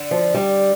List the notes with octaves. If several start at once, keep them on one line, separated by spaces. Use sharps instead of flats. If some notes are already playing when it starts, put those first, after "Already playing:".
Already playing: D3
F3
G3